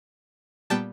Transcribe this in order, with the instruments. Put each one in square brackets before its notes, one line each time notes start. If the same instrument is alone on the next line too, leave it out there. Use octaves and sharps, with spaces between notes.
[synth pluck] A#2 G3 B3 G5 A5